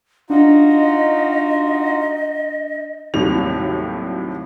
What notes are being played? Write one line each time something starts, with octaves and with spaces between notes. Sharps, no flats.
D4 D#4 F4 F#4 D#5
D#2 A2 C3 F#3 G3 F7